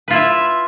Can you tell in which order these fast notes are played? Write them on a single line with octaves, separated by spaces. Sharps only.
B4 F4 E4 E5